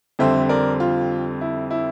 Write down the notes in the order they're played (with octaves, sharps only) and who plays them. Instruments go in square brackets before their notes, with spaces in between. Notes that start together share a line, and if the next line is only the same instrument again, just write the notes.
[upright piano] F2 D3 G3 C4 C5 E5
A#4 D5
F4
E4
E4